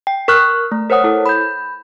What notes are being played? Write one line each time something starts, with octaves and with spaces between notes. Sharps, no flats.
G5
A#4 C#6 F6 F#6
A3
A#4 C5 C#5 F#5 D#6
E4 A4
B5 G6